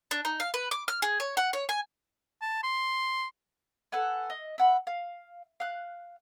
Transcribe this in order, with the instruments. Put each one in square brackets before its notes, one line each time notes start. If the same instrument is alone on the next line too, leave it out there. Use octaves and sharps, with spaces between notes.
[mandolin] D4
D#4
F5
B4
D6
F6
G#4
C#5
F#5
C#5
G#5
[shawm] A5
C6
[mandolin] A4 B4 F#5 G#5
D#5
E5 F#5 B5
F5
F5 F#6